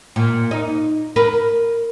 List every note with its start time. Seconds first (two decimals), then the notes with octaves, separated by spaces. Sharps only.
0.16 A#2
0.51 D#4
1.16 A#4 B4